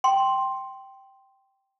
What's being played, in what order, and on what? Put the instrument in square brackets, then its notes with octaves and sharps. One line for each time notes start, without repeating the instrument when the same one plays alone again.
[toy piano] G5 C6